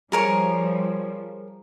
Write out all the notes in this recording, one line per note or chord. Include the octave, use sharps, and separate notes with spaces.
F3 G3 G#4 A#4 C#5